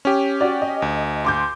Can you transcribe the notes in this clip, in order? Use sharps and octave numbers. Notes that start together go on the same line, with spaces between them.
C#4 G4
F#4 D5
D#5
D2
C6 D6 G6